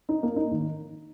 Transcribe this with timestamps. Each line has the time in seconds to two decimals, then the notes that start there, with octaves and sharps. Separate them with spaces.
0.09 D#4
0.23 A#3
0.36 D#4
0.51 D#3